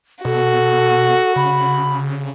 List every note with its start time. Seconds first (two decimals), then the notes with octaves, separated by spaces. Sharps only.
0.25 B2 F#4 A4
1.36 C#3 B5